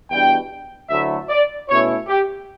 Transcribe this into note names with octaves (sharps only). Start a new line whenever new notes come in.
E2 B2 G3 D4 G5
D2 D3 F#3 A3 E4 E5
D5
B2 A3 C#4 E4 C#5
G4